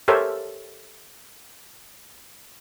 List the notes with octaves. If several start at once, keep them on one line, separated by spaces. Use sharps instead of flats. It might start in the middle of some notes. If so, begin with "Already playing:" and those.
G4 A4 A#4 C5 C#5 E5